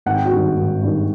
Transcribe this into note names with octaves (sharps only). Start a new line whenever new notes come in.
G#1 F#5
G5
F#4 F#5
G2 D#3
G#1
G2 D#3